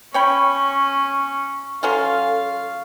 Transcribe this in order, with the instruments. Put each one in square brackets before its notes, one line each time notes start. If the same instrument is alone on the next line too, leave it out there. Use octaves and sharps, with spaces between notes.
[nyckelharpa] C#4 [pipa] C#5 G5 B5 [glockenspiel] C#6
[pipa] F#3 C#4 F4 [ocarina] A4 [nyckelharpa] F5